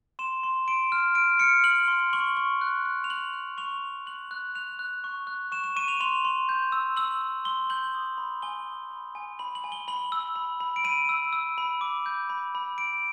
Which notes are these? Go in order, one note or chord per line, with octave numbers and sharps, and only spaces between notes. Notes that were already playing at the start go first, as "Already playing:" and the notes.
C6 E7
C6
C6 D7
F6
F6 D7
F6 C#7
F6 F#7
C6
C#6 F#7
C#6
F#6
F#6
F7
F#6 F#7
F#6
C#6 F7
C#6
F#6 F#7
F#6
F#6 F7
F#6
C#6
F#6
C#6 E7
E7
C#6 D#7
F7
C6 F7
C6
G6
E6
E6 F#7
E6
C6 G7
G6 F#7
D#6
B5
G#5 G7
D#6
B5
G#5
B5 F#7
F#7
G#5
G7
B5 F#7
E6
B5
B5
D7
B5 D#7
E6
E6
B5
D6
G6
B5
B5
B5 D7